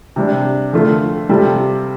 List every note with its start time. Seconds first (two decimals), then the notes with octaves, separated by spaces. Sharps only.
0.16 C3 G3 D4
0.73 F2 D3 A3 F4
1.29 C3 G3 F4 A4